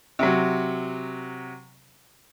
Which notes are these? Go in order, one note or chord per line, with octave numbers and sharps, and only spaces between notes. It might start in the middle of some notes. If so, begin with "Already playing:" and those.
C3 F#3